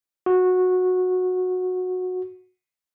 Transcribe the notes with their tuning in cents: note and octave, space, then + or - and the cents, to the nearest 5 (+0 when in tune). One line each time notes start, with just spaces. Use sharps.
F#4 -15